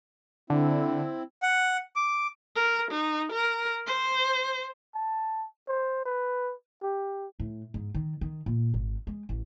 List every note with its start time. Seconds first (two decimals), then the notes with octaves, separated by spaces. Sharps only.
0.50 D3 C4 E4
1.43 F#5
1.96 D6
2.56 A#4
2.91 D#4
3.33 A#4
3.86 C5
4.95 A5
5.68 C5
6.06 B4
6.83 G4
7.40 A2
7.74 G#2
7.95 D#3
8.21 D#3
8.46 A#2
8.74 G#1
9.07 G#3
9.29 A1